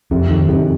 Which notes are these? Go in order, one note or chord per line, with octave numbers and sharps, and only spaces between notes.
F2 C3
F2 D#3
F#2 C3